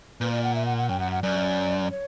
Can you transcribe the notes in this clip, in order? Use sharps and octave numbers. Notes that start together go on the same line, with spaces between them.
A#2 B4
D5
F#5
E5
F#5
F#5
F#2 G5
F#5
F#5
F#2 D5
C#5